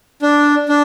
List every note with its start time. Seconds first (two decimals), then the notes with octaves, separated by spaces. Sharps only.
0.22 D4
0.69 D4